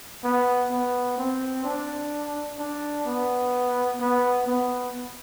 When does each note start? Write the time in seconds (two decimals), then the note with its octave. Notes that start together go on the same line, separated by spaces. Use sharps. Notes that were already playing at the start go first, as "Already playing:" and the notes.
0.24 B3
0.71 B3
1.18 C4
1.64 D4
2.58 D4
3.06 B3
4.00 B3
4.47 B3